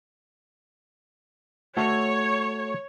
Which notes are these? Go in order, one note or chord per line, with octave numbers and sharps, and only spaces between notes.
A3 F#4 A4 C#5